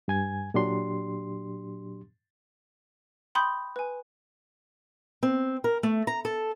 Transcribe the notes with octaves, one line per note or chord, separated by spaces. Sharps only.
G2 G#5 G#6
A#2 F#3 D4 G4 C6
G5 B5 C6 D#6 G6
B4 G#5
C4
A#4
A3
A#5
A4